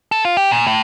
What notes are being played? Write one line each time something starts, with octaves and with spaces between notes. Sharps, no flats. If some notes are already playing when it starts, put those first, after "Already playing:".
A4
F4
G4
A#2
A2